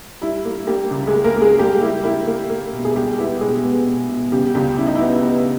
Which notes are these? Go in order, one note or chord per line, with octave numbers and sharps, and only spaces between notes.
G3 E4
A#3
G3 A#3 G4
C#2
G#3 G#4
A#3
A#3 A#4
A#3
G#3 G#4
G3 A#3 G4
A#3 E4
A#3 E4
A#3
A#3
B2
G#4
G3 G#3 G4
B3 E4
B2 G#3 G#4
B3
B2
B2
C#3 G3 G4
C#2 G3 G4
C#3 E4
D#4
E4
B3
B3